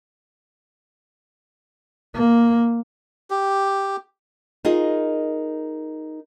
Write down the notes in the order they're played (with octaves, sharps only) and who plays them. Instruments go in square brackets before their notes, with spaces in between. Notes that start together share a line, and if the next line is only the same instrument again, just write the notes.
[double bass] A#3
[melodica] G4
[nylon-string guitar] D#4 F4 G#4 A#4 D#5